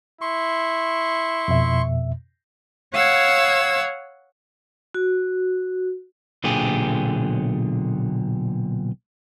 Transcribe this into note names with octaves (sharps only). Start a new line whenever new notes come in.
E4 C6 C#6
F2 B2 E5
C#5 F5 F#5 E6 G#6
F#4
B1 A#2 D3 G4 G#4